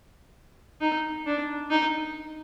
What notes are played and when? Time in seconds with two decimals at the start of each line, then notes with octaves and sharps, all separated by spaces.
0.81 D#4
1.26 D4
1.70 D#4